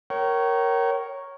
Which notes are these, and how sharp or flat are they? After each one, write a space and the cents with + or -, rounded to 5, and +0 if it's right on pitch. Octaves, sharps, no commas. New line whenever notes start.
A#4 +0 C#5 -5 G5 -40